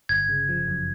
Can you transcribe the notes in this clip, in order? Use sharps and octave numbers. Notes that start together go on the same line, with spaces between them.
G1 G#6
C#3
F3
F#2